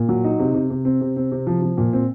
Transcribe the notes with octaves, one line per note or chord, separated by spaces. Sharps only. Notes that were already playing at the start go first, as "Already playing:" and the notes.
Already playing: A#2
F#3
D#4
C3
C3
C3
C4
C3
C4
C3
F3
F3
A#2
C4